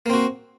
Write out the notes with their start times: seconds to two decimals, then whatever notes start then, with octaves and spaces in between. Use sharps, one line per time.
0.06 A#3
0.10 C4
0.13 F#4